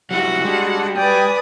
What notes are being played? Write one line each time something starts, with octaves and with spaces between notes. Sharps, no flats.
F#3 G3 E4 F#4 F#5
G3 G#3 D4
B4 D5 G5 G#5 D#6